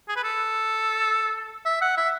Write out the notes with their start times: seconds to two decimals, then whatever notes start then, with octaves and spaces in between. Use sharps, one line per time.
0.08 G#4
0.16 B4
0.24 A4
1.66 E5
1.81 F#5
1.97 E5